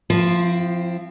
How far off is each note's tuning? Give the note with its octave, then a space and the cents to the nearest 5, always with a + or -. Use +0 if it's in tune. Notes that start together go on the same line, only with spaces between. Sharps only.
F3 +0 C4 +0 E4 +35